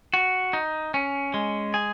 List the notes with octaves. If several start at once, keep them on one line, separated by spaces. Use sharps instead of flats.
F#4
D#4
C#4
G#3
G#4